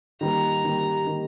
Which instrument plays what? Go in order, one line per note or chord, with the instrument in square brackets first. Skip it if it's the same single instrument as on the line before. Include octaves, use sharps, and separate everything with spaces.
[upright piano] D#3 G3 A#3 [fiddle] A#5
[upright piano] D#3 G3 A#3
D#3 G3 A#3